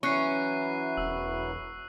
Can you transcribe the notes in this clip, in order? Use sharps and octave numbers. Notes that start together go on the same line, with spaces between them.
E3 F#3 C#4 E4 C#6 F#6 C7
E1 E6